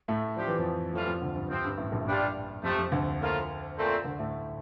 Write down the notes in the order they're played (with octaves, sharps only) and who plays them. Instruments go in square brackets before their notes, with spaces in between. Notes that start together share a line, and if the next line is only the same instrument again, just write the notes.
[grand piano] A2 A3
[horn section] C3 G3 D4 G4 [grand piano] F3
[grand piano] E3
F2 F3
[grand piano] F2 F3 [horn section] A2 E3 G3 C4 F4
[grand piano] F2 F3
D2 D3
G2
[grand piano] F2 [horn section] C3 F3 C4
[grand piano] G2
A1 A2
A#1 A#2
A2
[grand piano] G2 [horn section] G3 D4 F4
[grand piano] F2 [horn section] C3 F3 A3
[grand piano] F2
D2 D3
[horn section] A2 F3 A#3 F4
A#2 A3 C4
[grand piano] D2 D3
A2 A3